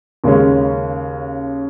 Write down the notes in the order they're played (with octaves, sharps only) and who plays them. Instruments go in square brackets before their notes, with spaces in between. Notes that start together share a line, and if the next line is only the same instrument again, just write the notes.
[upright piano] D#2 C#3 G#3 C#4